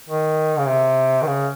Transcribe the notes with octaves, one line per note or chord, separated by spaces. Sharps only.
D#3
C#3
C3
D#3
C#3